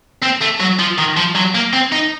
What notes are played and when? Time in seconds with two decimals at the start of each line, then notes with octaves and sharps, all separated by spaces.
0.23 C4
0.42 A3
0.60 F#3
0.79 F3
0.98 D#3
1.17 F3
1.35 F#3
1.55 A#3
1.73 C4
1.92 D#4